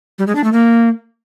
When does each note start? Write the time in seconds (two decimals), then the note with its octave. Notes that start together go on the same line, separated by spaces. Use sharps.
0.19 G3
0.27 G#3
0.35 D4
0.44 A3
0.52 A#3